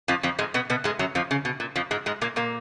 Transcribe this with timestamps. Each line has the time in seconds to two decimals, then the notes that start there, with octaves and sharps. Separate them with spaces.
0.08 F2 F3
0.23 F2 F3
0.39 G#2 G#3
0.54 B2 B3
0.70 B2 B3
0.84 G#2 G#3
0.99 F#2 F#3
1.15 F2 F3
1.31 C#3
1.45 B2
1.60 A#2
1.76 F2 F3
1.91 G#2 G#3
2.06 G#2 G#3
2.21 A#2 A#3
2.36 A#2 A#3